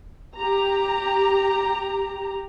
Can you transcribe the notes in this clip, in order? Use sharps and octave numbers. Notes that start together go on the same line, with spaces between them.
G4 A#5